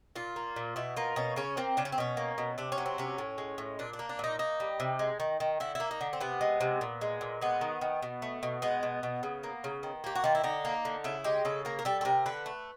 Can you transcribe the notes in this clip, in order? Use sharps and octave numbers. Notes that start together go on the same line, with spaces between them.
A#2 F4
A#3
A#2
B2 E4
A#3 F4
B2 C#4
C#3 C#4
A#3 C4
C#3 D4
C#4
C4
B2 C#4
A#3
B2
C3 D4
C#4
F#3
C4
C3 C#4
A2
G#3
A2
A#2 D4
D4
A#3
D4
A#2 D#4
A#3 D#4
G3
C3
G#3
D#3
D#3
D3 E4
A#3 E4
D#4
D3
C4
C3 B3
G#3
C3
A#2
G#3
A#2
G#3 B3
D#3
D#3
B2
A3
B2
G#3 B3
B2
B2
C#3
A#3
C#3
D#3
A#3 G4
F#4
D#3 F4
E4
D3 D#4
A#3
D3
C#3 E4
G#3 G4
C#3 A4
A#3 A#4
A#4
G3 A4
A4
C3 A#4
D3 B4
A3